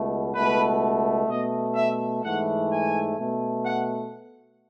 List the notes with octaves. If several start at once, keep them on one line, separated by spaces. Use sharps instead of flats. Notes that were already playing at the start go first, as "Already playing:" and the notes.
Already playing: C#2 B2 A3
C#2 B2 A3 B4
B2 A3 D#5
E5
G#2 E3 A3 F#5
G#5
B2 A3
F#5